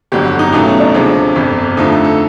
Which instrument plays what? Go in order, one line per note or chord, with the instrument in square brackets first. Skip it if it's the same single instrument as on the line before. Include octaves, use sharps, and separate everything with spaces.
[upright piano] G1 F2 D3 F#3 G4
F#4
D#4
C#2 B2 F#3 A3 D#4
C#4
D4
D2 C3 F3 G#3
G1 F2 C3
F2 D3 F3 A3 D#4
A4
A4